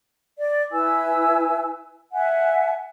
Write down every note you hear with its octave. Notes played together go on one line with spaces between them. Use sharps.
D5
E4 B4 G#5 E6
E5 F#5 G#5